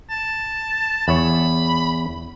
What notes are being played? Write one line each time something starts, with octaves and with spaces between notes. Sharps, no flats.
A5
E2 C#5 B5